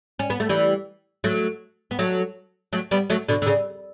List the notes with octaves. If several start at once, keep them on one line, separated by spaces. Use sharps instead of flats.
C#4
B3
A3
E3 G3
F#3 A3
B3
F#3 A3
F#3 A3
G3 B3
F#3 A3
B2 D3
D3
C#3